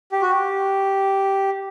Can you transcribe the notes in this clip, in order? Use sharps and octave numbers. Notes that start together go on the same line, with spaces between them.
G4
F#4
G4